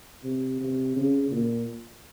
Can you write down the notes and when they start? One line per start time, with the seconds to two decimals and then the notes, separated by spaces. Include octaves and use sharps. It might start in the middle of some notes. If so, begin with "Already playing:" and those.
0.24 C3
0.61 C3
0.96 C#3
1.31 A#2